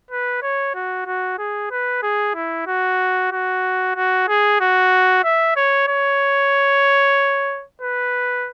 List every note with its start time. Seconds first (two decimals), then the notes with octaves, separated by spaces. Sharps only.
0.11 B4
0.42 C#5
0.75 F#4
1.06 F#4
1.39 G#4
1.71 B4
2.03 G#4
2.36 E4
2.67 F#4
3.32 F#4
3.96 F#4
4.28 G#4
4.61 F#4
5.24 E5
5.56 C#5
5.88 C#5
7.82 B4